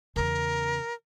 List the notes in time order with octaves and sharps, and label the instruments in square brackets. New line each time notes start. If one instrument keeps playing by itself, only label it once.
[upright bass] E2 C#3 [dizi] A#4